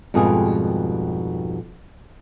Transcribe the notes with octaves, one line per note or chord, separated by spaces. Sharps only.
F2 G#2 B2 G3 F4 G#4